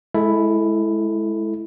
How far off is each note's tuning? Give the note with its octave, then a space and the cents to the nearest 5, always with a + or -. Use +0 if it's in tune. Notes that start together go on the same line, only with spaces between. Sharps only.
G#3 +25 E4 +0 A4 +0